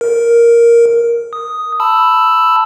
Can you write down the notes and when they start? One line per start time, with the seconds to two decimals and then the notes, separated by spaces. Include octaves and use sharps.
0.01 A#4
1.33 D#6
1.80 A5 B5 E6